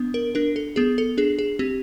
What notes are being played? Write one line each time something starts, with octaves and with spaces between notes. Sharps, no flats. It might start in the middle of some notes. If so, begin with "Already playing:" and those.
Already playing: B3 D4
A#4
D4 A#4
A4
B3 G#4
A4
D4 G#4
G#4
C4 G4